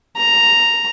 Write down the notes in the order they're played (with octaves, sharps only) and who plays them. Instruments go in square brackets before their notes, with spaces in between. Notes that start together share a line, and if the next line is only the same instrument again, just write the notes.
[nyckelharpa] A#5